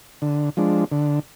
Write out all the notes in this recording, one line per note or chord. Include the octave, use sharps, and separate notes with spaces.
D3
F3 G#3 D4
D3